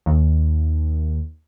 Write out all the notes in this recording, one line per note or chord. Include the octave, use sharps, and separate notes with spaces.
D#2